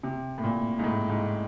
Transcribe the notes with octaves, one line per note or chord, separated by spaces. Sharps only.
C3
A2
A#2
G#2
A2
G#2